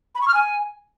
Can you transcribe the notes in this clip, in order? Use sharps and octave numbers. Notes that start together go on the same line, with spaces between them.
B5
C#6
F6
G#5